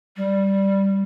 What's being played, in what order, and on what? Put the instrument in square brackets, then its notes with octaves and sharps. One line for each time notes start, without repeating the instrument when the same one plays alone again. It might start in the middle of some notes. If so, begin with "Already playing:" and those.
[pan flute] G3